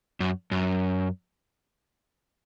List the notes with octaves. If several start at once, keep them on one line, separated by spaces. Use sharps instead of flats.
F#2
F#2